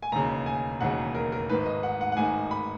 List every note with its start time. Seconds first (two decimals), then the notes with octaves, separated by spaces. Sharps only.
0.02 G#5
0.12 E1 D#2 C#3 A#5
0.46 G#5
0.81 E1 D#2 C#3 F#5
1.15 A#4
1.32 A#4
1.49 G#1 G#2 D#3 B4
1.66 D#5
1.83 F#5
2.01 F#5
2.12 F#5
2.17 G#1 G#2 D#3 G#5
2.51 B5